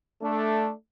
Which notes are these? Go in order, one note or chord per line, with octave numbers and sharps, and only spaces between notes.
A3 D4